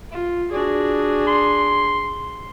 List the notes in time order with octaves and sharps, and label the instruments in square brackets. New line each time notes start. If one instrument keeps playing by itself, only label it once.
[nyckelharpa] F4
[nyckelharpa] D4 G#4 [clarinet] F#4
[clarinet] C6